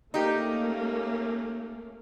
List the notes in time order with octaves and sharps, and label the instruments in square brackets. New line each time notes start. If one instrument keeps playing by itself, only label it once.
[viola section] A3 A#3 C#4 [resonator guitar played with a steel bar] D#4 G4